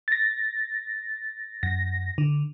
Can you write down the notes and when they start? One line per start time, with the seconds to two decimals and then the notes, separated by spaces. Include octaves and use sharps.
0.08 A6 A#6
1.63 F#2 A#6
2.18 D3